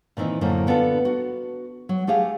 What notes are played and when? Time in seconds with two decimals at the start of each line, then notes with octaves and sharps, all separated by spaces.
0.17 A#2 D#3 E3 C4 D#4
0.41 F#2 A2 D3 A#3 E4 C5
0.67 D3 B3 D4 F4 A4
1.05 F#4
1.89 F#3
2.07 A3 G4 G#4 F5